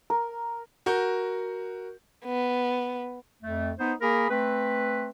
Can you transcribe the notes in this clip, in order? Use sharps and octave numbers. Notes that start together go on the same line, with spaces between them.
A#4
F#4 A#4 G6
B3
F2 A3
B3 D#4 C5
A#3 G#4 A#4 B5
A3 C4 B4